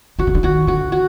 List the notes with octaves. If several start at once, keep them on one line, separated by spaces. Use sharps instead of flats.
D3 F#4
C#3
D3
D#3 F#4
D3 F#4
F#4